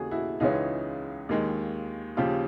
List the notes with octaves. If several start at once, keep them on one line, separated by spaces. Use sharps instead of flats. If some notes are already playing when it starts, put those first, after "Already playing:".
Already playing: D#2 C#3 E3 F#4 G#4 A4
E4 F#4
C#2 C#3 E3 G#3 C#4 D#4 F4
D#2 D#3 G#3
D#2 C#3 F3 F4 G4